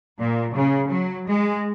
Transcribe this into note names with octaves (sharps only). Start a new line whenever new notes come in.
A#2
C#3
F#3
G#3